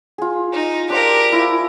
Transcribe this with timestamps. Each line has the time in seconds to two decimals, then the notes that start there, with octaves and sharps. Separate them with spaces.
0.18 F4 G#4
0.52 D#4
0.90 D4 G4 A#4 C5 F5
1.32 E4 F4